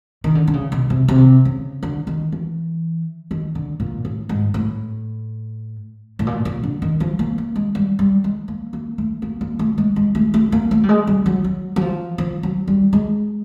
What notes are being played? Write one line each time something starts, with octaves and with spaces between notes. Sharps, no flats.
D#3
D3
D3
C#3
B2
C3
C3
C#3
D3
D#3
E3
D#3
D3
A#2
A2
G#2
A2
A2
A#2
A#2
D3
D#3
F3
A#3
A#3
G#3
G3
G3
G#3
A#3
A#3
A3
A#3
A#3
A3
G#3
G#3
A3
A3
A#3
A3
G3
G#3
G3
F#3
F#3
F#3
F3
F3
F#3
G3
G#3